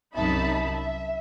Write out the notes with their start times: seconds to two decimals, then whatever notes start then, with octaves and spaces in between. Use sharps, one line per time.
0.15 C2 F#2 D#4 E5 A5 B5
0.74 E5